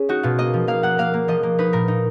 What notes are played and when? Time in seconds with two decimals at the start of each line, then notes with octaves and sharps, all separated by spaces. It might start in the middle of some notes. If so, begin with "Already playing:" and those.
Already playing: C#4 G#4
0.09 D#4 F#4
0.23 B2 F4
0.38 A#3 D#5
0.54 F3
0.68 A#3 F5
0.83 A#3 F#5
0.98 A#3 F5
1.14 A#3
1.28 F3 D#5
1.43 A#3
1.58 D#4 B4
1.73 A#2 A#4
1.88 D#4